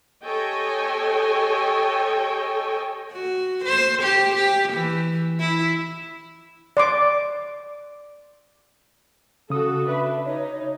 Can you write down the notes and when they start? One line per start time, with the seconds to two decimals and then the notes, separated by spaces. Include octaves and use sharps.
0.23 G4 A4 C#5 D#5 G5 G#5
3.12 F#4
3.64 C5
4.02 G4
4.35 G4
4.73 E3
5.40 E4
6.77 D5 C6 D6
9.50 C#3 F#4 A4 D#6
9.87 D4 B4 E5
10.25 D#4 C#5